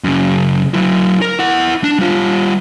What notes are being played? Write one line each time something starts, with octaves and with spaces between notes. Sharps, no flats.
F#2 C#3
F#3 E4
A#4
E4 F#5
D4
G3 F4